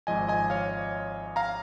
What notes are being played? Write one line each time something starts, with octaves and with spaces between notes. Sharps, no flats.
G#1 G#2 F3 D#5 G#5
D#5 G#5
C#5 F5
F5 A#5